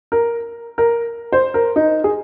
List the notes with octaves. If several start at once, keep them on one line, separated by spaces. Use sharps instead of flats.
A#4
A#4
C5
A#4
D#4
G#4